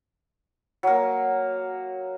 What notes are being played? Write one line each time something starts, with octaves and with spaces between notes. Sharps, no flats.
F#3 A#3